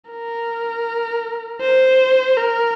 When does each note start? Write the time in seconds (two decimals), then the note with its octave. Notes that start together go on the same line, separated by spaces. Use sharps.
0.10 A#4
1.61 C5
2.37 A#4